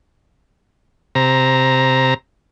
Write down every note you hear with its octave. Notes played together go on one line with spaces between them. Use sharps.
C3 A#5